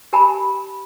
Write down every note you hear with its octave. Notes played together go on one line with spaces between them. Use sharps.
G4 A#4 G#5 A5 B5